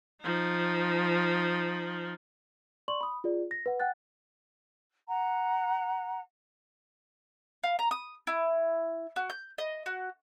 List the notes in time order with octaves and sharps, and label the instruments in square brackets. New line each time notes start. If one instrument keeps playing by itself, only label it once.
[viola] F3 D#4
[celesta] D5 C6 C#6 F#7
B5 D#6
F4 G#4 D5
A#6
B4 F#5
F#5 G5 F#6 A6
[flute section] F#5 A#5
[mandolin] F5
A#5
D#6
E4
F#4
G6
D#5
F#4